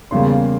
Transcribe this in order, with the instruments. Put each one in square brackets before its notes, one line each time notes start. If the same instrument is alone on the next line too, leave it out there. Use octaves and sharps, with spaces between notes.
[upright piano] E2 C#3 G3 A#3 C6